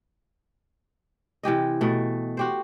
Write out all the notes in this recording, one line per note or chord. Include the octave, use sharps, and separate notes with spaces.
C3 E3 G4 D#5
B2 A3
F#4 G4 C5